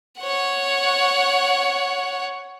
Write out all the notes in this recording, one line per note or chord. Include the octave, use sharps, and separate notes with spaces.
C#5 F#5